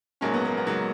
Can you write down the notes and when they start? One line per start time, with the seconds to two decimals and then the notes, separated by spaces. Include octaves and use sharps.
0.21 A#1 G#2 F#3 A#3 C#4
0.34 B3
0.45 A#3
0.57 B3
0.66 G#2 F#3 A#3